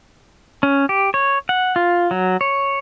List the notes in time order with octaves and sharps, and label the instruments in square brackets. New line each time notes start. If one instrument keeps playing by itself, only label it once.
[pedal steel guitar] C#4
G4
C#5
F#5
F4
F#3
C#5